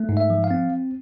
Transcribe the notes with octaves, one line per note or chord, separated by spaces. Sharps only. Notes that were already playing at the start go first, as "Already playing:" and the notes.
Already playing: A3
G#2
E5
F3
F5
C4